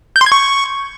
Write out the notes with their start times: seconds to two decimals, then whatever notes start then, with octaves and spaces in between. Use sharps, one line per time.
0.16 G6
0.21 C6
0.26 G#6
0.32 C#6